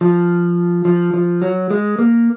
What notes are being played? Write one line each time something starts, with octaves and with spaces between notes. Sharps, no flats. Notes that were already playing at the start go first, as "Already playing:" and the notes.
F3
F3
F3
F#3
G#3
A#3